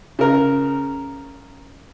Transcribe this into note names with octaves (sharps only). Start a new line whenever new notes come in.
C#3 A#4